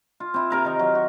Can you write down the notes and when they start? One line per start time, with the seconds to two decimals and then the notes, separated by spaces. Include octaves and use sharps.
0.20 F4
0.34 C4 E4
0.50 C3 A#4 F5
0.65 D#3 D#4
0.79 F#3
0.95 F#4